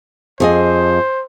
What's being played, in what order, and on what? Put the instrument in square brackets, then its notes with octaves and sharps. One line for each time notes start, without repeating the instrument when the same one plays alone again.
[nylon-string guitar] F2 G#4 D#5 [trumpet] C5